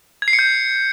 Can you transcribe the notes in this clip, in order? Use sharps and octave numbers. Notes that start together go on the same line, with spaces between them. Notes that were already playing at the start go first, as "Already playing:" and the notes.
G#6
C7
C#7
G6